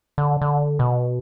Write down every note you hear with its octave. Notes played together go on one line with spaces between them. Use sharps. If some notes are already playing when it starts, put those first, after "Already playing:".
D3
D3
B2